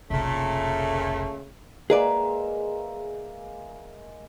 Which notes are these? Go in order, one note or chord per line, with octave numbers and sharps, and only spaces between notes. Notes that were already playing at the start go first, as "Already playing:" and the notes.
F1 B1 A#2 C#3 A3 A5
G#3 A#3 G#4 B4 D5 E5